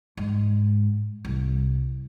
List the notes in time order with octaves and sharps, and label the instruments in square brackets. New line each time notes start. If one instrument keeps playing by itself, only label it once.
[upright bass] G#2
C2